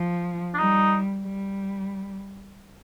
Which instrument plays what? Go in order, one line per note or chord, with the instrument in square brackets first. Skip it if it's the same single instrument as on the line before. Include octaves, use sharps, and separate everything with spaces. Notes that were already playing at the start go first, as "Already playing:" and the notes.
Already playing: [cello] F3
[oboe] D4
[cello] G3 [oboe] D#4
[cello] G3